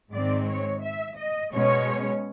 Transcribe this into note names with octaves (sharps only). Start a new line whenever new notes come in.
G#2 D#3 G#3 C4 D5
C#5
E5
D#5
B2 G#3 C#4 C#5